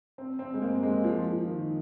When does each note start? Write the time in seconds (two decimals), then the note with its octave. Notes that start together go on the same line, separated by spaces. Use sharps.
0.18 C4
0.39 C4
0.54 G#3
0.62 A#3
0.83 G#3
1.04 F3
1.25 F3
1.47 D#3